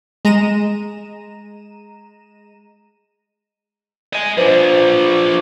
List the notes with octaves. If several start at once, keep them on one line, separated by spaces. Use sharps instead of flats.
G#3 A#5 D#7 E7
D#5 G#5
F3 D4 B4 C5